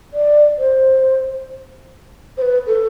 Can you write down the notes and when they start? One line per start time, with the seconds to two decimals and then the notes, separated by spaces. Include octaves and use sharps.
0.14 D5
0.58 C5
2.37 C5
2.42 B4
2.67 A4